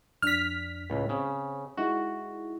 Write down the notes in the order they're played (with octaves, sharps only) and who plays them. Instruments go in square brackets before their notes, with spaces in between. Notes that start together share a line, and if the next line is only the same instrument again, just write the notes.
[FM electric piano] F2 D4 [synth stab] F6 B6
[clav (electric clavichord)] C#2 [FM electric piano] A2
[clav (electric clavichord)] C#3 [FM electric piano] C4
[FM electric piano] G#3 D#4 E4 [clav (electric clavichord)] F#4